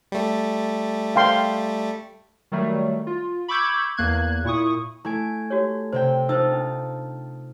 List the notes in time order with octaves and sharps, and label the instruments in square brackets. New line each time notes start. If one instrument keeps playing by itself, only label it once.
[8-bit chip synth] G3 A3
[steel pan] F5 G5 C6
[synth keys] D#3 F#3 G3 A3
F4
B5 C#6 D6 E6 G6 G#6
E2 A#3 F#6 G#6
A#2 E4 C#6 D#6
[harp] A3 G#5 D7 [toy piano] E4
[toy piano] F#4 G4 C#5
[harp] C3 C4 G5 [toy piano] C5 D5
[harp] D#4 F4 A5 [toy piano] C5 E6
[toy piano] D4